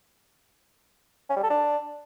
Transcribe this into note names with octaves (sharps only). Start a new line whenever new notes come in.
C#4
G3
A4
D4